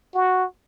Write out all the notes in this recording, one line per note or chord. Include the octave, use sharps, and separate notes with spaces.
F#4